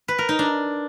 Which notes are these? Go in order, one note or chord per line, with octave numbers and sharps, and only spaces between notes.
B4
A#4
D#4
D4